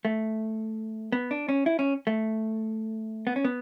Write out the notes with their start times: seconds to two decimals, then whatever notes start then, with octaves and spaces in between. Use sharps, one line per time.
0.05 A3
1.12 B3
1.31 D4
1.49 C#4
1.66 E4
1.79 C#4
2.07 A3
3.27 B3
3.36 C#4
3.45 B3